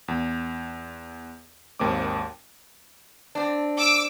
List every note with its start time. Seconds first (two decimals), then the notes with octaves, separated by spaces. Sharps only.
0.08 E2
1.80 G#1 D#2 A#3 C4 D6
3.35 C4 D4
3.77 D6 E6